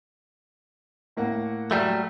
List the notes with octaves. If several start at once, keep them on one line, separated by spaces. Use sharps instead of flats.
A2 A#3 F#5
F#3 G3 A3